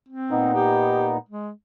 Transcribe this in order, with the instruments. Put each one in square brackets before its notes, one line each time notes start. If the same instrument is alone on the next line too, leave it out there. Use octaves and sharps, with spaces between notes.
[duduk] C4
[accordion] A#2 B3 D#4
[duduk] G4
G#3